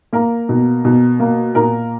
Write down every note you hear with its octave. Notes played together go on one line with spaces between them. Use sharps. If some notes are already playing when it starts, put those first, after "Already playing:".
A#3 A#4
B2
B2
A#3
A#2 A#4